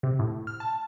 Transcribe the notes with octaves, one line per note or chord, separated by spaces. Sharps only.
C3
A2
F6
A5